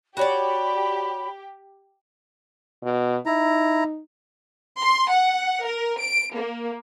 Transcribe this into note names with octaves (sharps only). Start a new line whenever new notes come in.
F#4 G4 C#5 D5 B5
B2
D#4 E4 A#5
C6
F#5
A#4
D7
A#3